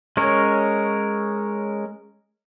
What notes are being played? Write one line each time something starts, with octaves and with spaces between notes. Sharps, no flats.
G#3 C#4 A#4 C#5